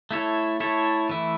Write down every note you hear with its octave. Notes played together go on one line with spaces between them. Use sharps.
A3 E4 A4 C#5
A3 E4 A4 C#5
E3 A3 E4